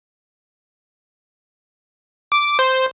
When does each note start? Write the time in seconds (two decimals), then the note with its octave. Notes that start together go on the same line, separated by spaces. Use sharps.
2.32 D6
2.59 C5